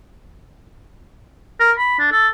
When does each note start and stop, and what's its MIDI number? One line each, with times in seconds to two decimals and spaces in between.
1.60 1.72 70
1.78 1.98 83
1.99 2.09 62
2.12 2.29 69